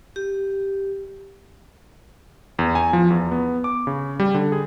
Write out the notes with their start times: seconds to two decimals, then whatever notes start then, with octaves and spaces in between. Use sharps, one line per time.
0.16 G4
2.59 E2
2.75 G#5
2.93 F3
3.10 E2
3.31 B3
3.64 D6
3.87 C#3
4.20 G3
4.34 D3
4.52 G#4